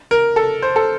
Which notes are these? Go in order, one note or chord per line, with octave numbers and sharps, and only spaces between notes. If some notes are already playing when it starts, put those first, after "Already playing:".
A#4
A4
C5
A4